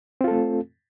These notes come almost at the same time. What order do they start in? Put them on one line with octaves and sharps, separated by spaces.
C4 F4 A4 A3